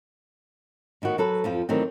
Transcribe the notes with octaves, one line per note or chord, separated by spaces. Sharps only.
A2 D#3 B3 F#4
F#3 A4 B4
F2 F3 F4
D#3 E3 F#3 A3 C4